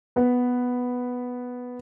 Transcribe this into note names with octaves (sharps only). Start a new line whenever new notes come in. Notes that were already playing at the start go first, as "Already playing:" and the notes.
B3 B4